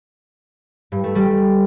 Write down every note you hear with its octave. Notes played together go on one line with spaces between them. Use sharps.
G2
A3
G3